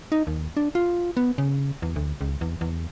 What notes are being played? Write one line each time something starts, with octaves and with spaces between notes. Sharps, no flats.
D#4
D#2
D4
F4
B3
C#3
E2
D2
C#2
E2
E2